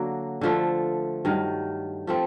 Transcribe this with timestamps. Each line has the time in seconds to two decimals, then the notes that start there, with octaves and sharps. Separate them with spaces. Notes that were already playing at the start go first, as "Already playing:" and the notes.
Already playing: D3 F#3 A#3
0.41 D3 F3 A3
1.25 G2 D#3 F#3
2.07 F3 A3 C4